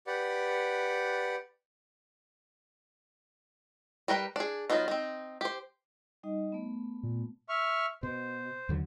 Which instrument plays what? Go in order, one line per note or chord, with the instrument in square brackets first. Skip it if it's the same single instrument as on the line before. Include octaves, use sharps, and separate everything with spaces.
[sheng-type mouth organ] G4 B4 D5 F#5
[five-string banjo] G3 A#4 B4 G5
D4 G#4
F#3 G3 B3 D#4 F4
C4 D#4
G4 C5
[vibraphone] G3 D#4 D#5
A3 B3
[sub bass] A#2
[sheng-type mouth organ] E5 C#6 F6
[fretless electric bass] B2 [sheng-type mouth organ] C5
[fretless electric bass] D#2 D3 F#3